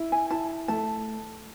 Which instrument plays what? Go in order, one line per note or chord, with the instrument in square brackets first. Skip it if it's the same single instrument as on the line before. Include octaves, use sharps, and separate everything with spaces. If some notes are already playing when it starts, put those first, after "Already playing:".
Already playing: [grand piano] E4
[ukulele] G#5
[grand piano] E4 [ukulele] A5
[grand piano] A3 [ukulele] A5